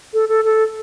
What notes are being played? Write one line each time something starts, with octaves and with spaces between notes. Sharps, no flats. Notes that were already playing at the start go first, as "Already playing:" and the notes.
A4
A4
A4